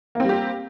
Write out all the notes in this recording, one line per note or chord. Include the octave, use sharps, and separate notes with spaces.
G3 A#3 C4 G4